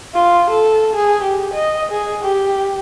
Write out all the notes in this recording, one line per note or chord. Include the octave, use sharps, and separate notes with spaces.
F4
A4
G#4
G4
D#5
G#4
G4